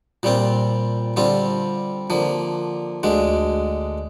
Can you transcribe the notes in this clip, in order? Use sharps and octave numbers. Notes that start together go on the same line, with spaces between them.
A#2 G3 C4 F4
D3 G3 C4 F4
D3 F3 A#3
D2 D3 G#3